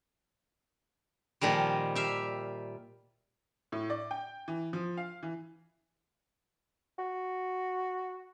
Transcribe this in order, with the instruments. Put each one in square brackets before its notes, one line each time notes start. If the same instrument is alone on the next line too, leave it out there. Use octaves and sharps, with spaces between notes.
[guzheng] A#2 D#3 F3 G3
G4 E5 F5
[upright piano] A2
D5
G5
E3
F3
F5
E3
[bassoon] F#4